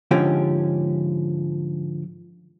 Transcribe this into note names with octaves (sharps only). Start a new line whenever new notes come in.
G#2 D3 F3 C#4 G4